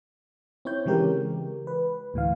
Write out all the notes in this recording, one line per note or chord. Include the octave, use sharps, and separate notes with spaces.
C4 E4 C#5 G6
C#3 E3 G#3 G4 A#4
B4
D2 A2 E3 F5